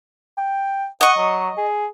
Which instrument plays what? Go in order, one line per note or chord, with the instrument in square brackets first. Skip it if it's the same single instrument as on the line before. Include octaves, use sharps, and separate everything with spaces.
[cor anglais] G5
[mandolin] D#5 C#6 [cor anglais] F#5
[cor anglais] F#3
G#4